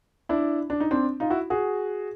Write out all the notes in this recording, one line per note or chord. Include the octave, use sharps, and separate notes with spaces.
D4 E4
D4
D#4
C4 D4
D#4 F4
E4 F#4
F#4 G#4